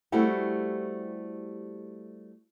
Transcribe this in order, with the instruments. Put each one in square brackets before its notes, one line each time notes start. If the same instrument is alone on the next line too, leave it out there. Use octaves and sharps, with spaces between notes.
[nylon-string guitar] G3 A3 C4 E4 F#4 G4